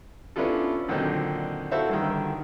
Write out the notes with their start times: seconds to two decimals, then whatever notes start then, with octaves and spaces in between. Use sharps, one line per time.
0.36 B3 C#4 D4 E4 F4 A4
0.88 A#2 D3 D#3 F#3 C4 D#4
1.71 E4 F#4 A4 C5 E5 F5
1.90 G2 D3 D#3